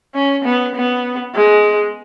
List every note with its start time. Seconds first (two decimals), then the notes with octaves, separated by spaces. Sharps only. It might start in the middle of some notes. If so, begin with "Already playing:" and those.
0.15 C#4
0.45 B3
0.76 B3
1.35 G#3